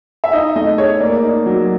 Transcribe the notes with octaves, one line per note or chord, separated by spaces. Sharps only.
E5
D#4 D#5
A3 D#5
G#4 C#5
A#3 D5
D#4
F#3